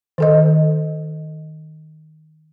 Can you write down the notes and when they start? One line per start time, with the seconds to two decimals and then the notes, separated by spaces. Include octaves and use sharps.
0.18 D#3 A4 D#5